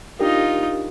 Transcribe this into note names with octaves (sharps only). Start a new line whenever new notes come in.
D4 D#4 F4 G4 A#4